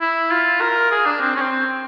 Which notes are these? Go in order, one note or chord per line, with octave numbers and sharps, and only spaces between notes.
E4
F4
A#4
G#4
D4
C4
C#4
C4